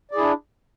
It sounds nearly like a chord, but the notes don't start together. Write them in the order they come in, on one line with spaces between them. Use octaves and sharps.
D5 G#4 E4 D4